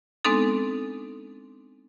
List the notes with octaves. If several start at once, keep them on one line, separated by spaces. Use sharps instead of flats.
G#3 B3 C4 D4 D#4 A4